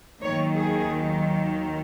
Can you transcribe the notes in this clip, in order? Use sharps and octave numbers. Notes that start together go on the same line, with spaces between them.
D#2 D#3 F#3 C#5
G#4